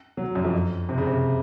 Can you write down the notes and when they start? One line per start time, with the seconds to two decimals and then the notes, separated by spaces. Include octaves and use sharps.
0.17 F#3
0.35 F#2
0.44 F2
0.89 C3
0.98 C#3
1.07 C3